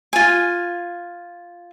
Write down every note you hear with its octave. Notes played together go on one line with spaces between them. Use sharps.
F4 G#5